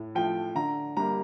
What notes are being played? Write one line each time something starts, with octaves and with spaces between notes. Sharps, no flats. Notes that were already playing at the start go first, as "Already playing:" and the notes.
Already playing: A2
F3 A3 G5
D3 A#5
G3 A#3 A#5